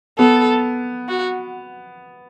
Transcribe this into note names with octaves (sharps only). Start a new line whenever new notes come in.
B3 A4
F#4